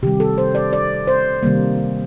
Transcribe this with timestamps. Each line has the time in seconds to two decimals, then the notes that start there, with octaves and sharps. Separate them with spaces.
0.03 C3 D#3 G3 G4
0.20 A4
0.38 C5
0.55 D5
0.73 D5
1.07 C5
1.43 C3 D#3 G3 A#3